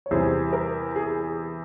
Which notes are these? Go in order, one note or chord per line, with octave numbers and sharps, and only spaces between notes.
C#5
E2 C3 G3 G#4 C5
A#4
G#4